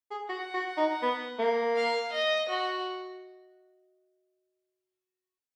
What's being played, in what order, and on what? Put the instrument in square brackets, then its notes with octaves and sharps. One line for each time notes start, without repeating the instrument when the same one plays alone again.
[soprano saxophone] G#4
[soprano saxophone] F#4 [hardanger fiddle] F#5
[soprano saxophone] F#4
D#4
B3
A#3
[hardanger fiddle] F5
D#5
F#4